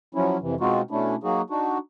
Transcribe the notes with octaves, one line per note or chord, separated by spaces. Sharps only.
F3 F#3 C#4 E4
F2 C3 E3
B2 G#3 C4 D#4 F4 F#4
B2 A3 C#4 D4 E4
F#3 A#3 D#4 F#4 G#4
D4 D#4 F#4